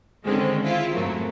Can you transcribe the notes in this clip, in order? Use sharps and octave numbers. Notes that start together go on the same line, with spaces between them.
D3 D#3 G#3 C4 C#4
E4 F4
F#2 A2 C3 F#3 A3 A#3